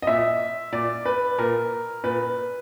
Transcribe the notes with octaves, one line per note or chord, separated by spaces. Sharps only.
D#5
A#2 E5
A#2 D5
B4
A#2 A#4
A#2 B4